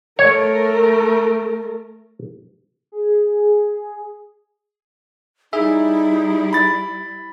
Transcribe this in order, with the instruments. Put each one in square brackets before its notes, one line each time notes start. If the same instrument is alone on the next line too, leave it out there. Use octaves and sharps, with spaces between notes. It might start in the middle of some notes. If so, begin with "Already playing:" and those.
[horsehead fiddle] A3 A#4 [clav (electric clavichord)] C#5
[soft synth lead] G#4
[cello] G3 E4 [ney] D#4 [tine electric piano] G#4 E5
[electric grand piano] B5 A6